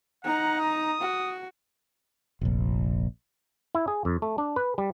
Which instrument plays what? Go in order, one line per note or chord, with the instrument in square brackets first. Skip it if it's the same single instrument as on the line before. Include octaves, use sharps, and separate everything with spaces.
[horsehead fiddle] D#4 A#5 [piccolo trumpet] F#5
[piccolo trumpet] D#6
[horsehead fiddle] F#4
[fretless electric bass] F1 A#1
[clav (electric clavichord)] E4
G#4
F2
A3
D4
B4
G3